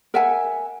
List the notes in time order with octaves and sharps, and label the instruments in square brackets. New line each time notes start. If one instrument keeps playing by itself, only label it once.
[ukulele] A#4 E5 F#5 G#5